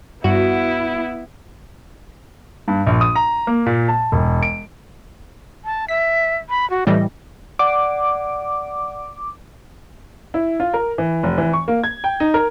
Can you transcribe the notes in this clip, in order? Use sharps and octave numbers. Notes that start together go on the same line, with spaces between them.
G2 B3 E4 F#4
G2
A#1
D#6
A#5
A#3
A#2
A5
E1
D7
A5
E5 B6
B5
F#4
A2 E3 G3 D#5
D5 F#5 D6
E4
F4
A#4
E3
F1
E3
C#6
A#3
G#6
G5
D#4
A#4